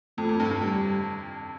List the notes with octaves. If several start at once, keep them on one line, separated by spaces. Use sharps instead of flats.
F2 A3
F2
G2
G2
G2 G3